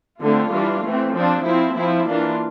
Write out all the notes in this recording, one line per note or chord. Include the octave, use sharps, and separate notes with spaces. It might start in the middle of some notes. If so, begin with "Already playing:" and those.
D3 A3 C4 F4
E3 G3 D4
E3 A3 C4
F3 C4 D4
F3 C4 E4
F3 C4 E4
E3 A#3 D4 F4